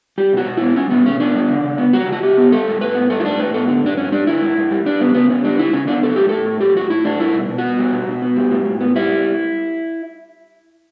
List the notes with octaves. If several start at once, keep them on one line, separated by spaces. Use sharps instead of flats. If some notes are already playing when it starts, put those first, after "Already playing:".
G3 G4
B2 F#4
B2
B3 E4
G3 C#4
B2 B3
B2 C#4
B3 D4
G3
C#3
C#3
B3
G3 F#4
C#3 F#4
C#3 G4
B3
G3 A4
A2
A2 B4
B3
G3 A4
E4
A2 D4
A2 B4
B3 A4
D3
G2 D4
G2 C#4
G3 D4
D3 E4
G2
G2
G3
G3 D4
C#3 B3
C#3 B3
B3 C#4
G3 D4
C#3 E4
C#3 C#4
B3 D4
F#3 A4
A2 G4
A2 A4
A3
F#3 G4
A2 F#4
A2 E4
A3 D4
G3 E4
B2
B2
F#4
B3
G3
B2
B2
B3
G3
A2
A2
B3
G3 E4